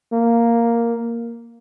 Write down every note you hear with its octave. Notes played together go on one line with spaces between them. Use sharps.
A#3